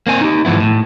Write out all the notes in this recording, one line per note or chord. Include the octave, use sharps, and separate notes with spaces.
A#3 C4 G#5
D#4 G4
G#2 E3 F3 B3 E4
A2